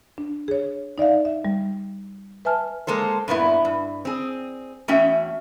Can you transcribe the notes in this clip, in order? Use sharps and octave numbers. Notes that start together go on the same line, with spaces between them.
D4
G#4 C#5
D#4 D5 E5 F5
E5
G3
B4 E5 G#5 A5 F6
G#3 A#3 A4 C5
G2 A#2 B3 E4
G2
C4 G#4
E2 A3 C#4 F#4 E5 G5